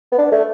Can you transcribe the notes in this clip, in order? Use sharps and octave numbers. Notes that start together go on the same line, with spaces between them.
B3
D4
A3